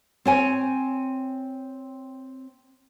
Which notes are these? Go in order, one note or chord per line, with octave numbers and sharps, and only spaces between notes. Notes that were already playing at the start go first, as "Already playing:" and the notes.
C4 C#5 G#5